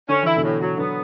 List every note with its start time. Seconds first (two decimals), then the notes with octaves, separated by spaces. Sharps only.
0.09 D3 C#4
0.23 E3 E4
0.36 B2 D3
0.43 A2
0.61 F#3
0.78 D3 F#3 B3